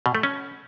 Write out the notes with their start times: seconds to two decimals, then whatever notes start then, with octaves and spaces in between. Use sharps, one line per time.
0.06 B2
0.15 A3
0.23 C#4